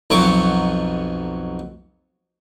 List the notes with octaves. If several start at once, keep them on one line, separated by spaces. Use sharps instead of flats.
B1 F2 B2 F#3 C#5 D6